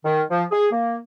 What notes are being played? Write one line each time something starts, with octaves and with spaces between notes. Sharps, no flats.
D#3
F3
G#4
A#3